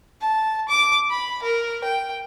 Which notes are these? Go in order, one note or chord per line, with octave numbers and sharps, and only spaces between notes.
A5
D6
B5
A#4
G5